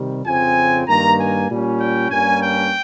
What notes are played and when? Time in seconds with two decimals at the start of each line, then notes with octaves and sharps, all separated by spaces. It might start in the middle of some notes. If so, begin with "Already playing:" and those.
Already playing: C3 D#3 G3
0.25 F2 C#3 F3 C4 G#5
0.86 G2 D#3 A#3 A#5
1.17 G#5
1.49 A#2 G3 C#4
1.79 G5
2.10 G2 G3 A#3 C#4 G#5
2.41 G5